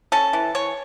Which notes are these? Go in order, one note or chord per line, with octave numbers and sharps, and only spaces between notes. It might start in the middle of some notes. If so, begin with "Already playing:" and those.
C#4 A4
E3
E3 C#5